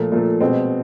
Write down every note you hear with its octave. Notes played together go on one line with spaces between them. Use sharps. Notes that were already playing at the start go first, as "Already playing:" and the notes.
Already playing: A#2 F3 A3
A#2 F3 A3
B2 G#3 C4